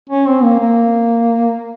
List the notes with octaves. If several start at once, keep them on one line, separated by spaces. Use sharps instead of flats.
C#4
C4
A#3
A#3